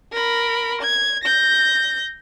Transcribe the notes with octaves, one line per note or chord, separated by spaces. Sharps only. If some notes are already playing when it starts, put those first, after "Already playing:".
A#4 B5
G#6
G6 A#6